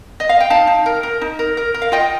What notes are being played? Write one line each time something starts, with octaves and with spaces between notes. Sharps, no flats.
D#5
F5
G5
D#4 F5 A5
D#4
A#4
A#4
D#4
A#4
A#4
A#4
F5
F4 D#5 G5